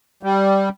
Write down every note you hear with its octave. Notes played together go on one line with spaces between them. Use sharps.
G3